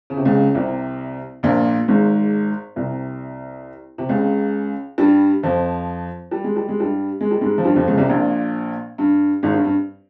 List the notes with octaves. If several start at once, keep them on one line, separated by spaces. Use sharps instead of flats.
C#3
C3
C#2 C#3
C2 C3
A#1 A#2
G#1 G#2
C2 C3
C3
C#2 C#3
G2 G3
F2 F3
G3
G#3
G3
G#3
G2 G3
G#3
G3
G#2 G#3
F3
G2 G3
F2 F3
C#2 C#3
C2 C3
A#1 A#2
G2
G#1 G#2
G2
G2